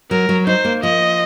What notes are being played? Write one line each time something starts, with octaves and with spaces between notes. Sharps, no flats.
F#3 A#4
F#3
D#4 C5
A#3
F3 D#5